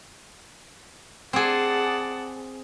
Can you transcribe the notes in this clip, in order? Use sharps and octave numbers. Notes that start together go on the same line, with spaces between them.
C4 G#4 D5 F#5 A5